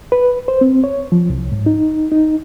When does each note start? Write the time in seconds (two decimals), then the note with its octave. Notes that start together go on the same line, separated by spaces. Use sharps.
0.12 B4
0.48 C5
0.61 C4
0.84 C#5
1.12 F3
1.30 C2
1.52 G#2
1.66 D#4
2.12 D#4